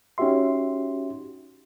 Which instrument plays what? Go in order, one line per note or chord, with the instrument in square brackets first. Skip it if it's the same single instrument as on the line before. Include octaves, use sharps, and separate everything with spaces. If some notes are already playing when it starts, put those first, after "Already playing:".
[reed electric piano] C#4 D#4 F#4 G4 E5 C6